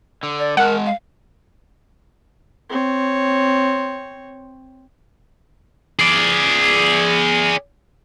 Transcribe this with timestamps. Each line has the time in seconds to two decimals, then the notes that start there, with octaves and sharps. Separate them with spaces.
0.23 D3
0.39 D5
0.57 G#3 A#4 F#5 A5
0.85 F5
2.69 C4 C#5
5.99 G#4 D5